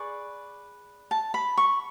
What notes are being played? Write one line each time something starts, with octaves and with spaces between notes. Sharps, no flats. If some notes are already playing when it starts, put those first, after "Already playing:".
Already playing: G#4 B4 D5 C#6
A5
B5
C#6